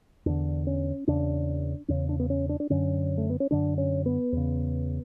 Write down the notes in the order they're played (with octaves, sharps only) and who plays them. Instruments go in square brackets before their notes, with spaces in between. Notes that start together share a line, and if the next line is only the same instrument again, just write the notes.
[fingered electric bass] E2 D3 D4
C#4
E2 C#3 D4
E2 C#3 C#4
D4
B3
C#4
D4
D4
F#2 D3 C#4
A3
B3
C#4
F#2 D3 D4
C#4
B3
E2 C#3